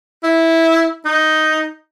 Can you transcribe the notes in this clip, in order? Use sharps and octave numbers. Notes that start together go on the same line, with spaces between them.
E4
D#4